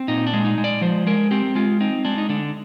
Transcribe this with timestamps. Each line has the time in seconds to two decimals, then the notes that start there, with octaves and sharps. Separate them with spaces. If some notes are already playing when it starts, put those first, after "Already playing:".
Already playing: C4
0.08 A#2 D#4
0.26 D4
0.33 G#3
0.45 D#4
0.58 G#3
0.64 D5
0.81 F3 C5
1.07 G#3 A#4
1.31 C4 G4
1.55 G#3 F4
1.80 C4 D#4
2.05 G#3 D4
2.18 D#4
2.29 D3 D4